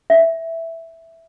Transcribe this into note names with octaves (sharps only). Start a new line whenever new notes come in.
E5